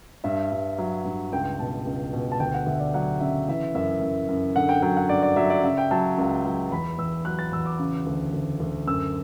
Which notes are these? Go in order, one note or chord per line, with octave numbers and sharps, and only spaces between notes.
G2 E5
G2
F#3
G2
C#2 G5
B2 A5
C#2
B2
A5
D2 G5
F#5
D2 E5
D5
F#3 F#5
C#3 E5
E3 E5
F#2 E5
F#2
F#2
D3 F#5
G5
F#3 G5
F#5
G2 D5
D5
F#3 E5
D5
C#3 E5
G5
F#3 A5
C#2
F#3
E2 B5
E2 E6
F#3 F#6
A6
E2 E6
D6
C#3
D2
D2
D2
F#2 E6